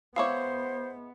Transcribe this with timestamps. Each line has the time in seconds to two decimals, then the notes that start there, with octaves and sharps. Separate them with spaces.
0.16 G#3 B3 E4 C5 C#5 F5 D6